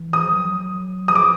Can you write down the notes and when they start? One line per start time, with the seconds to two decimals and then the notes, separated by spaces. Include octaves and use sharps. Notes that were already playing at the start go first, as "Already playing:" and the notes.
Already playing: E3
0.13 D#6
0.23 F3
0.33 F#3
1.08 F3 D#6
1.15 D6